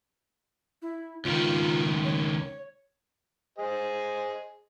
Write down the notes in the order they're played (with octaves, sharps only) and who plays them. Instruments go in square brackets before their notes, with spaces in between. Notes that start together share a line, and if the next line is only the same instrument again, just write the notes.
[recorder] E4
[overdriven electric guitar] C#2 D#3 [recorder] F4
[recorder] C#5
[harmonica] G#4 C5 D#5